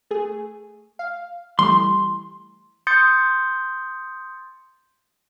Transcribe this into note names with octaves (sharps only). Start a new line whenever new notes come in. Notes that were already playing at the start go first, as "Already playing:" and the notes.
A3 G#4
F5
E3 G3 A3 C6
C6 D#6 G6 A6 C#7